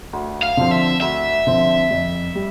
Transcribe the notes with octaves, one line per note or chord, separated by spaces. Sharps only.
D2
F5
D3 F3 C4
E5
D2 E5
D3 F3 C4
F2
G3